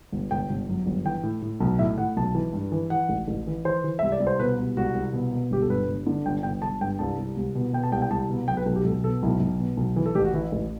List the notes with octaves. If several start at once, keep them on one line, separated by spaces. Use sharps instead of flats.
G1
G1 G5
G1
F#2
G1
E3 G5
A2
A2
B1
A2 E5
A2 F#5
B1 A5
E3
G2
E3
E3 F#5
A1
A1
E3
E3 C5
E3
C2 E5
D5
C2
C5
B2 B4
C2
C2 F#4
C2
B2
B2
G1 G4
A4
G2 B4
G1
D3
G1 G5
G1 G5
G1 A5
G2 G5
C2 A5
C2
C2
B2
B2 G5
A5
C2 G5
G5
C2 A5
B2
B1 G5
B4
B1 A4
G4
B1 A4
B2 A4
B1 E4
B1
B2
B1
E3
A4
A1 G4
F#4
E3 E4
A1